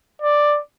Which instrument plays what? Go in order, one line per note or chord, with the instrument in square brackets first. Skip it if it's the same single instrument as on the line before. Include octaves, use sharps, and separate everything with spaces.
[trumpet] D5